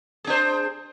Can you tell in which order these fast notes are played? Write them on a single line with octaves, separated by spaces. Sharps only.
G#4 D4 C5